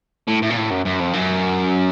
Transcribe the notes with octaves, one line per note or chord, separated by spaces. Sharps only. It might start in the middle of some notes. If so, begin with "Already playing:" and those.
A2
A2
A#2
A2
F#2
F#2
F2
F#2